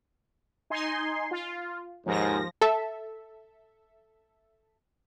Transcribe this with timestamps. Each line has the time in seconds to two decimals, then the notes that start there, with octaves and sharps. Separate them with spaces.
0.70 D#4 G#5 C6
1.31 F4
2.06 D#2 G#2 F3 A#6
2.61 A4 E5